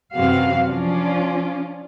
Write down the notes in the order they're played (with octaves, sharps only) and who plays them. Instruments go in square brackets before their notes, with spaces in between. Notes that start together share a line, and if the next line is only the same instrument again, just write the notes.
[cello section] F#2 C3 E3 F#4 F5
F3 C#4 D4 F4